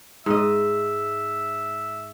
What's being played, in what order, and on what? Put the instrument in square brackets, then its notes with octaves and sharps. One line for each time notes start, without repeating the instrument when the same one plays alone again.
[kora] G#2 D#5 [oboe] E5